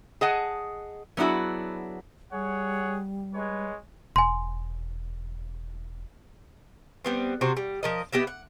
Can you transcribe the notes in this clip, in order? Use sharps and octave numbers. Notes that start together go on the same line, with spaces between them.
G#4 D#5 F#5 A5
F#3 B3 D4 E4 F#4 G#4
G3 G#4 C#5 F#5
G#3 B4 C#5
E1 G#5 C6
G3 B3 C4
C3 F#4 C5
G3
F3 A#4 D#5
B3 G4 D#5 E5
F#5